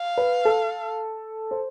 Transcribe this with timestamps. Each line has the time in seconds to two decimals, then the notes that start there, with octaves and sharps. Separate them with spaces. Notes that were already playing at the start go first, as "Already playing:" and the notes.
Already playing: F5
0.17 B4
0.45 A4
1.51 C5